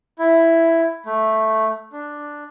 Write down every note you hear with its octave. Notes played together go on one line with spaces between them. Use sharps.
E4
A3
D4